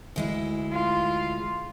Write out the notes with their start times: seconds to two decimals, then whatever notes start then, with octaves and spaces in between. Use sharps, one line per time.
0.16 D2 G#3 E4
0.72 F4